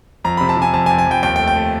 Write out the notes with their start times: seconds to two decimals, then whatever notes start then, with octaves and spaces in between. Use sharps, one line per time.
0.25 F2 A#5
0.37 C3 B5
0.49 A5
0.57 C3 G#5
0.73 F2 A5
0.86 G#5
0.90 F2
0.98 G#5
1.07 F2 G5
1.23 D#2 G5
1.36 G5
1.39 A3
1.48 G5
1.56 A3